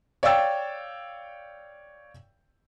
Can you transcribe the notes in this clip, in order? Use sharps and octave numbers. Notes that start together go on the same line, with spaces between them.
C#5 D5 F5 G5 E6 A6